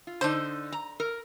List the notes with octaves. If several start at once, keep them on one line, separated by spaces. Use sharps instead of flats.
F4
D3 D4 D#4 C5
A#5
A#4